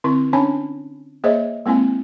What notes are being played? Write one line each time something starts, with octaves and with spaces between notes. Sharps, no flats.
D3 C4 E4 C#6
C#4 D4 C#5 G#5 A5 B5
A#3 G#4 C5 C#5 D#5 E5
G#3 A#3 C4 E4 G#5